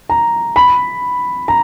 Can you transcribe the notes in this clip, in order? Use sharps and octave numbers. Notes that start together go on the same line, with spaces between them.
A#5
B5
A#5